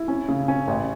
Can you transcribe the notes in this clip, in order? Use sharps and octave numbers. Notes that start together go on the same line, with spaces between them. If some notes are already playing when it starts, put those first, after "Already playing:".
Already playing: E4
C#4
C#3
C#4
A1